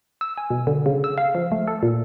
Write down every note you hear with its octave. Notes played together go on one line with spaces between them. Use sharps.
E6
G#5
B2
D3
C#3
E6
F5
F3
A3
A4
A#2